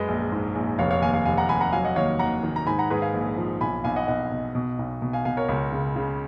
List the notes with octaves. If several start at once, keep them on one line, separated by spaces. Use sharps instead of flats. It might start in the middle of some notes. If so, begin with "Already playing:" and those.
Already playing: F#2 G#3 B4 D#5
A#1
G#2
A#1
F1 C#5 F5
C#5 F5
D#2 F5 G#5
F5 G#5
F1 F5 G#5
F#5 A#5
F1 G#5 B5
F#5 A#5
F#3 F5 G#5
D#5 F#5
D#2 C#5 F5
D#2 F#5 A#5
D#3
A#5
G#2 G#5 B5
F#5 A#5
G#2 G#4 B4
F5 G#5
A#1
F3
B1 G#5 B5
B1 F5 G#5
D#5 F#5
B1 D#5 F#5
B2
B2
B1
B2
F5 G#5
B2 F5 G#5
A#4 C#5
C#2
C#3
C#3